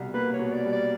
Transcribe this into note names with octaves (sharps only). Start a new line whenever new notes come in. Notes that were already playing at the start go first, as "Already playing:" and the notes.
Already playing: C2 B2 G3
A#3 B4
C#5
B2
D5
G3
D5